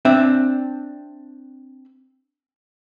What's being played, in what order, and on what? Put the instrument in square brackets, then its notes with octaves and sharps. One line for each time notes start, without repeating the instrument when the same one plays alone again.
[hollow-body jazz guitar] C4 D4 E5